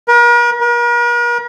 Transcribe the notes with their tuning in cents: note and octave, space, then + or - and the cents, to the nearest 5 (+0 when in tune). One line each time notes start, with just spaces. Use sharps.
A#4 +45
A#4 +45